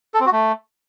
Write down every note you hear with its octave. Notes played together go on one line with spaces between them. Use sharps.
A4
C4
F#4
A3